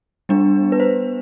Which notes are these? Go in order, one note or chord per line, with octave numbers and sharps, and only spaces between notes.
G3 B3 D4
B4
C5